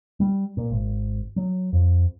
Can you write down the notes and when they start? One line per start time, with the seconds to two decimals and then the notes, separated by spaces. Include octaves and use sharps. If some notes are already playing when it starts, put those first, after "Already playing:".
0.20 G3
0.57 A#2
0.71 G#1
1.36 F#3
1.73 F2